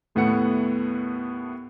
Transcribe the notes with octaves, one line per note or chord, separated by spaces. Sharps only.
D#2 A2 A3 B3 F#5 C#7